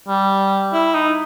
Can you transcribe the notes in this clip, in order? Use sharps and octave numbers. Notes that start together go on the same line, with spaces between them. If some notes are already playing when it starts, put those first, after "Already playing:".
G3
E4
D#4